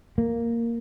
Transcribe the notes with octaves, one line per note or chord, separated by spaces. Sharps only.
A#3